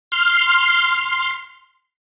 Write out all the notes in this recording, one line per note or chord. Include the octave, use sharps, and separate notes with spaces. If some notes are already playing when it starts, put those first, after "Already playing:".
C6 F6